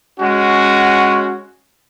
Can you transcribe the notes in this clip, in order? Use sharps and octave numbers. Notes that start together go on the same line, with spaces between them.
G#3 C#4 F#4